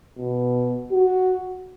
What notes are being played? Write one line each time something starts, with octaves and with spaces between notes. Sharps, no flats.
B2
F#4